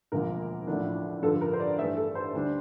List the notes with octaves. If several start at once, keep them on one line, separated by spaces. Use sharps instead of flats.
E1 D2 D3 F3 A#3 A#4
A1 A2 F3 A3 D4
G2 D3 F3 A4
A#4
C5
D5
G2 E3 A3 E5
A4
C5
D2 D3 G3 D4